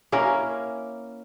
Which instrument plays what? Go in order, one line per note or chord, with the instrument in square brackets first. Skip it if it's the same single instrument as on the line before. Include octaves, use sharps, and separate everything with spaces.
[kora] A#3 C#4 E4 A#4